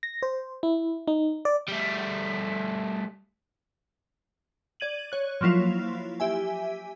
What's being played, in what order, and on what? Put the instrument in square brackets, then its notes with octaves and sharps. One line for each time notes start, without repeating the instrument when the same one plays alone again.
[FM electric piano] A#6
C5
E4
D#4
D5
[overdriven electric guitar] G3 A3
[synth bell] D5 G#6 D#7 F#7
C#5 F#6
F3 F#3 A#3 E4 F4
G4 E5 G#5